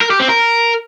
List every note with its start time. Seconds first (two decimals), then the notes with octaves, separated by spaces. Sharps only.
0.01 A#4
0.10 G4
0.20 C4
0.29 A#4